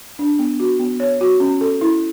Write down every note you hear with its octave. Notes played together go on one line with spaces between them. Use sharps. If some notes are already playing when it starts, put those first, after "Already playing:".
D4
B3
F#4
B3
C#5
F#4
C#4
A4
E4